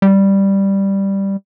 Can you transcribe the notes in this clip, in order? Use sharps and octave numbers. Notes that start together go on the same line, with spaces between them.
G3